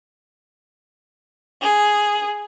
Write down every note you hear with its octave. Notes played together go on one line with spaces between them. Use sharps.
G#4